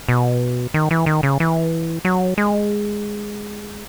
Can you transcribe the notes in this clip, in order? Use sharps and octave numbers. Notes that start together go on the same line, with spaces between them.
B2
D#3
E3
D#3
C#3
E3
F#3
G#3